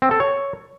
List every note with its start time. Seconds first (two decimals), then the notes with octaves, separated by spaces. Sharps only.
0.02 C4
0.11 A4
0.20 C#5